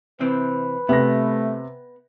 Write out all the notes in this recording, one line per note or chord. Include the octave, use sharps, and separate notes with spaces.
C3 E3 C4 B4
C3 A3 B3 A#6